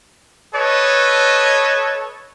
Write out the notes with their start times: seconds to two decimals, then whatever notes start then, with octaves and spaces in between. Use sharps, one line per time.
0.54 A4 B4 C#5 D#5